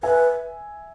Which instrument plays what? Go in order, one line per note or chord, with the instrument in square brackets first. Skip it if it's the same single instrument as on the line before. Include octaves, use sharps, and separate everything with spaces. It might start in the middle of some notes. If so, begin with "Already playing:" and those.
[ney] B4 [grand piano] E5 G#5